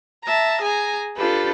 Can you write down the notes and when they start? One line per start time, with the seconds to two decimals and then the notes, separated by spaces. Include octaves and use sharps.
0.24 E5 A5 A#5
0.61 G#4 G#5 A#5
1.17 D4 F4 G4 A4 B4